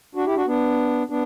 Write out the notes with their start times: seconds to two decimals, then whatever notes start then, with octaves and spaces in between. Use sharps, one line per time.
0.15 D4 F#4
0.26 E4 G4
0.36 D4 F#4
0.46 B3 D4
1.10 B3 D4